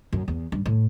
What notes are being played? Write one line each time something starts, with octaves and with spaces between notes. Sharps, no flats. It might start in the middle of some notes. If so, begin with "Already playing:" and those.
F#2
E2
G2
A2